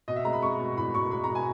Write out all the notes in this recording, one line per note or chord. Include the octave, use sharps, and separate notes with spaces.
B2 D#5
E5
G#3 A#5
B5
G#3 C#6
B2
E2 B5
B2 C#6
G#3 B5
A#5
B2
G#5